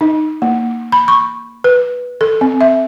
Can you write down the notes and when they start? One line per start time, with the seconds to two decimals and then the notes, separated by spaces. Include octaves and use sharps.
0.01 D#4
0.42 A#3
0.92 B5
1.08 C#6
1.64 B4
2.21 A4
2.41 C4
2.61 E5